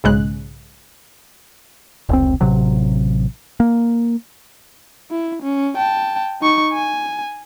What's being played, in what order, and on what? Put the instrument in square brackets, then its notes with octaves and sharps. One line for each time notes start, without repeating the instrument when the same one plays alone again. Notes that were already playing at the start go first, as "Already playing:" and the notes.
[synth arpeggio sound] B1 G#2 C#3 G#3 F#6
[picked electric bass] F1 C#2 C4
A1 C3 F#3
A#3
[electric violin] E4
C#4
G5 A5
D#4 C#6
G#5